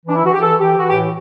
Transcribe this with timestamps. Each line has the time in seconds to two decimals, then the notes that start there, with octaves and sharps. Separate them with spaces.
0.06 E3 D4
0.15 E4
0.24 E3 F#4
0.33 G4
0.41 E3 A4
0.59 E3 G4
0.77 E3 F#4
0.88 G4
0.94 A2